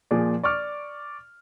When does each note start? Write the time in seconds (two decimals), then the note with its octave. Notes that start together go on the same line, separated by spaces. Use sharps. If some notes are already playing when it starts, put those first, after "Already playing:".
0.11 A#2 F3 G#4 D5
0.43 D5 C#6 D6 F6